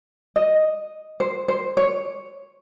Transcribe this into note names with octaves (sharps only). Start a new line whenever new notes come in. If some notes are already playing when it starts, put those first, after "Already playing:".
D#5
C5
C5
C#5